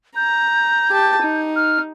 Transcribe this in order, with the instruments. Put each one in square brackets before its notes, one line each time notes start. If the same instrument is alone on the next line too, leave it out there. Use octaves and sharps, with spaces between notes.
[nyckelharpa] A#5 [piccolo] G6
[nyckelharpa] G4 A5
D#4
[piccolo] F6